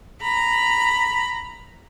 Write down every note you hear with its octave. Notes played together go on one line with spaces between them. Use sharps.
A#5 B5